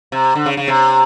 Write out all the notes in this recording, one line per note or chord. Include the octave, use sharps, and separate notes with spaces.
C3
D3
C#3
C#3
C3